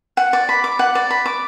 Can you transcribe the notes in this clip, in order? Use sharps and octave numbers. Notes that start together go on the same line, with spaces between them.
F#5
D5
B5
D6
F#5
D5
B5
D6